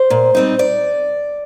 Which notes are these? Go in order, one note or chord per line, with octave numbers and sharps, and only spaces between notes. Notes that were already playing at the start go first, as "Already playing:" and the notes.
Already playing: C5
A#2
G3 C4 D#4
D5